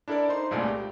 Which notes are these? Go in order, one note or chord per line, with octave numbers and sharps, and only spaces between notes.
D4 E4 A4 A#4 D5
D#4 C5 C6
C2 G2 A#2 G#3 A3 D5
G4